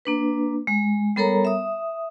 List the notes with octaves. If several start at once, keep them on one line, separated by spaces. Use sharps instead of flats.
A#3 D4 B4
G#3
G3 B3 A4 A#4 C#5 A#5
E5 D#6